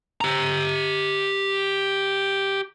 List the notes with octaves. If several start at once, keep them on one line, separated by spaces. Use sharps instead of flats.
G4 A#5